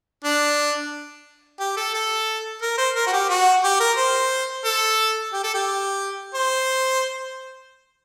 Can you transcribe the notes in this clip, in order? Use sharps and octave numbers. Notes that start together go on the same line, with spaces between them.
D4
G4
A4
A4
A#4
C5
A#4
F#4
G4
F#4
G4
A#4
C5
A4
G4
A4
G4
C5